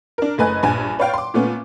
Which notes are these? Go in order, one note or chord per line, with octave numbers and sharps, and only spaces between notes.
D4 A#4
F#1 A3 B4 D#5 G#5 F#6
A#1 G2 G#5
B4 C#5 D5 F5 G5
C6 D6
A#2 A3 B3 C#4